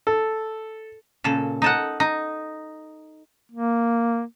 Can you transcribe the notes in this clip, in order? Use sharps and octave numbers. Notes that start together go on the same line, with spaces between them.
A4
A#2 C#3 A4
D#4 A4 F#5
D#4
A#3